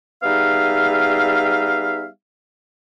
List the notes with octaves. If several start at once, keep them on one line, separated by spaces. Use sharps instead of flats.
G3 B3 D#4 G#4 E5 F5